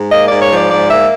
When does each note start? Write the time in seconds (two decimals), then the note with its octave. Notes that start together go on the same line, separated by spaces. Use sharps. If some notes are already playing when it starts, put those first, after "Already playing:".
Already playing: G#2
0.12 A#3 D#5
0.27 G#2 D5
0.42 C#5
0.51 F3
0.56 D5
0.71 G#2 D5
0.90 A#3 E5